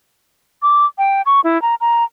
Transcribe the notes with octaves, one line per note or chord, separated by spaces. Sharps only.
D6
G5
C#6
E4
A#5
A#5